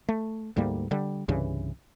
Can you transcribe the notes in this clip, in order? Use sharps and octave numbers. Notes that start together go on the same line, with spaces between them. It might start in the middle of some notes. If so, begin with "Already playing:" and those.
A3
D2 G#2 G3 A#3
D3 G3
C2 G2 C#3 E3